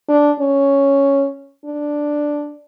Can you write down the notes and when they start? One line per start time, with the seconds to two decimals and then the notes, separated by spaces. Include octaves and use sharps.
0.09 D4
0.40 C#4
1.65 D4